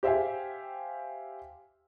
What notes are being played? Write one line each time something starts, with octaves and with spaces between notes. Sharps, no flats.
G4 C5 E5 F5 G5 G#5